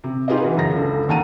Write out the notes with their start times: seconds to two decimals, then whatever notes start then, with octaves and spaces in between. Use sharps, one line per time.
0.04 C3
0.28 D#4 F4 G4 G#4 B4 D#5
0.40 E3 F#4 B4
0.57 F#2 C#3 A#5 A#6
0.73 C#2 D3
1.09 D#2 A#3 F#5 A5 A#5 D#7